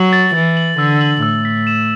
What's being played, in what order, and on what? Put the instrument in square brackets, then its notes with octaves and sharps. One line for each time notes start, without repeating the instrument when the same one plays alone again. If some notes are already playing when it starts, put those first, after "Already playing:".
Already playing: [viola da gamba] F#3 [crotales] F#7
[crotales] A6
[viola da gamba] E3 [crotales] A6
[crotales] F#7
[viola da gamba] D3 [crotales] E6
[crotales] F#7
[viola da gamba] A2 [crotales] E6
[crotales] B6
E7